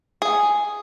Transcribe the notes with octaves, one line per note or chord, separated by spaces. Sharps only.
G#4